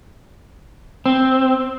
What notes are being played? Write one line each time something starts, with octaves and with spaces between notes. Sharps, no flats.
C4